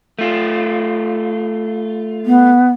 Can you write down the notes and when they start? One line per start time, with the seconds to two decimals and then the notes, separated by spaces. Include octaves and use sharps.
0.19 A3 F4
2.25 B3